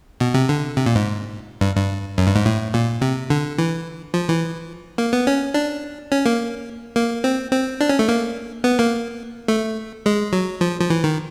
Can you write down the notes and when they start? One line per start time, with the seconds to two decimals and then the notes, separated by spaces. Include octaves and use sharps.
0.20 B2
0.34 C3
0.49 D3
0.77 C3
0.86 A#2
0.95 G#2
1.61 G2
1.75 G2
2.18 F#2
2.26 G2
2.36 G#2
2.46 A2
2.74 A#2
3.01 C3
3.30 D3
3.58 E3
4.14 F3
4.29 E3
4.98 A#3
5.13 B3
5.27 C#4
5.54 D4
6.12 C#4
6.25 A#3
6.95 A#3
7.24 C4
7.52 C4
7.81 D4
7.89 C#4
7.99 A3
8.08 A#3
8.64 B3
8.79 A#3
9.48 A3
10.06 G#3
10.33 F#3
10.61 F3
10.81 F3
10.90 E3
11.04 D#3